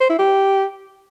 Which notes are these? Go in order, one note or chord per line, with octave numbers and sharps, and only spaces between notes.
C5
E4
G4